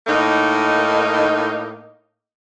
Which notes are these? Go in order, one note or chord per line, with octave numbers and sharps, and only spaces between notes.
A2 A#3 D#4